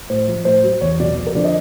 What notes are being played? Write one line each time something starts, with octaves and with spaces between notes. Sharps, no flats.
A2 C5
F3
A2 C5
F#3
E2 C#5
B2 F#3 D5
F2
A#4
D3 F3 D5
D#5